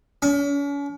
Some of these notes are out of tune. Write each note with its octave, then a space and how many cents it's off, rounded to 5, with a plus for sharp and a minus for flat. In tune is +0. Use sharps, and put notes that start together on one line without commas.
C#4 +40